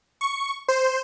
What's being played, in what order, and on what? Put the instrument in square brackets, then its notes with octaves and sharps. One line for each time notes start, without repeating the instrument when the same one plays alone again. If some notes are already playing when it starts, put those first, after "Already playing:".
[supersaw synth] C#6
C5